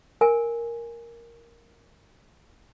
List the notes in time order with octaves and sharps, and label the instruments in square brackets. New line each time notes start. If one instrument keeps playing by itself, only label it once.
[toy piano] A#4 G#5